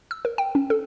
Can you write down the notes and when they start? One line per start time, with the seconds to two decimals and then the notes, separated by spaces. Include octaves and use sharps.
0.11 E6
0.25 A#4
0.38 G5
0.55 C#4
0.70 A4